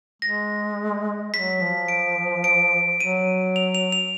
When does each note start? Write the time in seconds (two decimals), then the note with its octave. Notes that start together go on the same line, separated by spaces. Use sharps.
0.22 G#3 A#6
1.33 F#3 B6
1.61 F3
1.88 D7
2.44 D7
3.00 F#3 D#7
3.56 F7
3.75 F7
3.92 F7